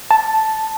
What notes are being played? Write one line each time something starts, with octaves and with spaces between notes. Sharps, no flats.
A5